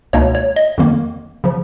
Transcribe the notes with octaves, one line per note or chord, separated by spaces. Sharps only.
C#2 B2 A#3 D#4 C#5
C#5
D#5
F2 D#3 A#3
C#3 F3